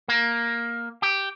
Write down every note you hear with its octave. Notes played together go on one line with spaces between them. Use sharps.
A#3
G4